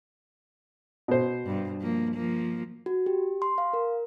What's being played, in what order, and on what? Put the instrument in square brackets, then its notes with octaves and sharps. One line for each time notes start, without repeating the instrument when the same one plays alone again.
[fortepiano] B2 C5
[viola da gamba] G2
F3 A#3
F3 A#3
[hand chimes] F#4
G4
C6
F5
A#4